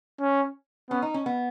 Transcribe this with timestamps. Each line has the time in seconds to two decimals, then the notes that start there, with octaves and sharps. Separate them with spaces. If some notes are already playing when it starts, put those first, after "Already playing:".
0.21 C#4
0.90 B3 C#4
1.02 D#4
1.14 C#4
1.26 B3